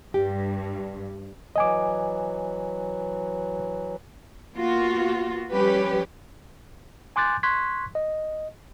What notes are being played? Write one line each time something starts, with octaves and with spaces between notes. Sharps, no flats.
G2 G4
E3 F#3 D#5 G#5 D6
A#3 B3 F4 F#4
F3 G3 C#4 G4 B4
G#5 C6 D6 F#6 G6 A6
C6 C#6 F#6 G#6 B6
D#5